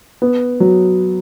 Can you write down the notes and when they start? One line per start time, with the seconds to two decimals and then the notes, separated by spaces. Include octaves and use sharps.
0.22 B3
0.60 F#3